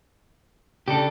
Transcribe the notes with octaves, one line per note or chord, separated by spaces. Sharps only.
C#3 D4 G4 A4